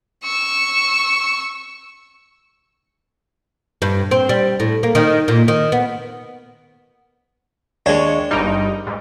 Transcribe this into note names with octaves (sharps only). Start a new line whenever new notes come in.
C#6 E6
G2
C4
G3
A2
A#3
D#3
A#2
D#3
B3
D#2 G#3 D4 C#5
G1 G2 G3 D#4 A#4
G#2